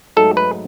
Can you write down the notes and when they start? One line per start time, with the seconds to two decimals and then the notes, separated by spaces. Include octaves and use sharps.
0.17 G#2 F#3 A3 D#4 A4
0.37 B4